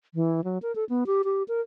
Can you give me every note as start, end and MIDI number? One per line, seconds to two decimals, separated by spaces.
0.14 0.44 52
0.44 0.58 54
0.62 0.74 70
0.75 0.85 69
0.89 1.04 59
1.07 1.22 67
1.24 1.43 67
1.48 1.61 70